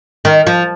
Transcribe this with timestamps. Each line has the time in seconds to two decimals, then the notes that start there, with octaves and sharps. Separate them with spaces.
0.25 D#3
0.47 F3